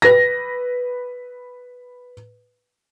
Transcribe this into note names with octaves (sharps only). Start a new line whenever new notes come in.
B4 A#6